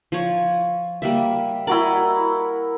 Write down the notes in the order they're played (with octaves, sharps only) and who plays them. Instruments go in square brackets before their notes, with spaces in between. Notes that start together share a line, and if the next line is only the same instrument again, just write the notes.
[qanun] F3 C#5
G3 A#3 E5
[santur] E4 F#4 A#4 [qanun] D5 D#5